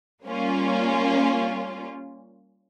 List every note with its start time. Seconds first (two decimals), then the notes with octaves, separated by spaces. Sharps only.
0.24 G3 A#3 C#4 F4